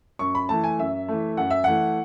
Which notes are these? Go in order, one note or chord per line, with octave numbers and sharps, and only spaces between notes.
F#2 C#6
B5
E3 A3 A5
G#5
F#2 E5
E3 A3
F#2 F#5
E5
E3 A3 F#5